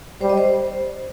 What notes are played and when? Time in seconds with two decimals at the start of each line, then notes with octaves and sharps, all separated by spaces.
0.21 G3 C5
0.29 D#5
0.38 C5